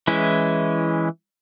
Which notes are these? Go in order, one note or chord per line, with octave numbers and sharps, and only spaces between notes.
E3 G#3 C#4 E4